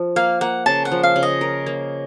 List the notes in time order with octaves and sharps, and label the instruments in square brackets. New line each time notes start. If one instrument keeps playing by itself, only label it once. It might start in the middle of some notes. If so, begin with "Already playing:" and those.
Already playing: [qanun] F3
[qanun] A#3 [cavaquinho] F5
[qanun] A#3 [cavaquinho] F#5
[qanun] C#3 [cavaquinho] A5
[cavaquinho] F#5
[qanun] F3
[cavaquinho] F5
[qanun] C#3
[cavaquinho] D#5
[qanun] A#4
A#3